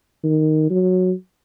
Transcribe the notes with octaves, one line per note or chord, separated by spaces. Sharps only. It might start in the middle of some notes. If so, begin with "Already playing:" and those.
D#3
F#3